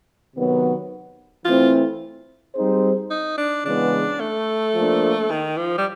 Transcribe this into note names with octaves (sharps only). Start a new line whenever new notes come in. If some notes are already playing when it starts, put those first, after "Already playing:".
C3 D#3 F#3 B3
E3 A3 C4 E4 F4
G3 C4 D#4 G#4 C5
D#4
D4
C#3 E3 G#3 B3 D4
A3
F3 A#3 D4
D#3
F3
G3